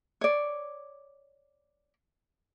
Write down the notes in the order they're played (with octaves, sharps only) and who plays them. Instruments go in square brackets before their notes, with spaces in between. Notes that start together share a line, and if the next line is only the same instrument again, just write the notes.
[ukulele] C#5 D5